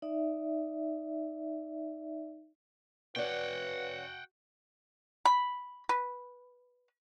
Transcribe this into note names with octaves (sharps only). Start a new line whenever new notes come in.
D#4 D5 E5
C#4 F#4 B4 C#5 D5 F#5 G5
B5
B4